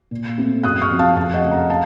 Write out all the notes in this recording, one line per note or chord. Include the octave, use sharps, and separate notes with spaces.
A#2
A3 C4
F#2 D#6 F#6
C#6 F6
F3 C4
F5 A5
F2 F5 A5
D#5 F#5
C#3 A3
F#5 A#5
F5 A5